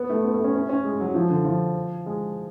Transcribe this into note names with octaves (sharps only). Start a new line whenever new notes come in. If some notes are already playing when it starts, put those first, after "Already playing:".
Already playing: B3
A3
B3
A3
C#4
C#4
C#4
G#3
F#3
F3
D3
F3
G#3